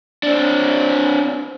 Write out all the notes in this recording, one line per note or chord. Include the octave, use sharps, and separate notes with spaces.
C4 D4